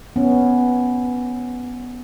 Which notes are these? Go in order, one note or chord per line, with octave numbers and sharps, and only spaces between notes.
B3 C#4